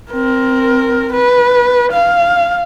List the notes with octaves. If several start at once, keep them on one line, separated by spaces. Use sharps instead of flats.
C4 A#4
B4
F5